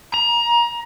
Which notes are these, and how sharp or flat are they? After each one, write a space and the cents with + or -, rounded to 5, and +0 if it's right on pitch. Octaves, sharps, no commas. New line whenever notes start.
A#5 +25